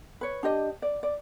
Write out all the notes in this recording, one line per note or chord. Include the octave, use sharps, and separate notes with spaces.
B4 C#5
D4 G4 D#5
D5
D5